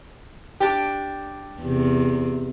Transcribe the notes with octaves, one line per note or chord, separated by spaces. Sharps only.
D4 G4
E2 C3